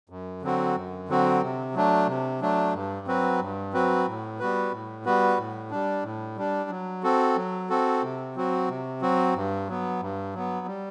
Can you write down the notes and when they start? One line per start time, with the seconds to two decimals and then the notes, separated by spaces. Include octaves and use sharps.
0.10 F#2
0.42 D3 F#3 C4 F#4
0.76 F#2
1.09 D3 F#3 C4 F#4
1.42 C3
1.74 F#3 A3 D4
2.07 C3
2.41 F#3 A3 D4
2.73 G2
3.07 F#3 C4 F#4 B4
3.40 G2
3.73 F#3 C4 F#4 B4
4.07 A2
4.39 G3 B3 F#4 B4
4.72 A2
5.05 G3 B3 F#4 B4
5.38 A2
5.71 G3 D4
6.04 A2
6.37 G3 D4
6.70 F#3
7.03 C4 F#4 A4
7.36 F#3
7.70 C4 F#4 A4
8.03 C3
8.36 F#3 C4 F#4
8.68 C3
9.01 F#3 C4 F#4
9.35 G2
9.68 F#3 B3
10.01 G2
10.34 F#3 B3
10.67 G3